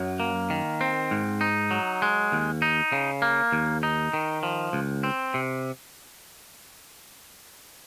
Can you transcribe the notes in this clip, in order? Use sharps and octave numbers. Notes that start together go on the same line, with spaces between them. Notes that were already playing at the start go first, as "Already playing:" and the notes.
Already playing: F#2 F#3
A#3
D#3
C4
G#2
D#4
F#3
G#3
D#2
D#4
C#3
A#3
D#2
D#4
D#3
F3
C#2
C4
C3